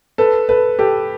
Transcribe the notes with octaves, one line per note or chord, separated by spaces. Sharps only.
A4 B4
A4 B4
G4 A4